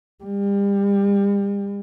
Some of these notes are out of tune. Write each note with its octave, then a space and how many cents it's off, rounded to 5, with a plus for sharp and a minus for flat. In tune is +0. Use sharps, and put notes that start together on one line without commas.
G3 +35